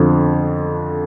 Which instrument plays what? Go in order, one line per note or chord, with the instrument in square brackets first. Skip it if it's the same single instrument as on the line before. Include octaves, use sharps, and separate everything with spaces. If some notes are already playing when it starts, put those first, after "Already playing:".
Already playing: [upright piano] F2 D3 F3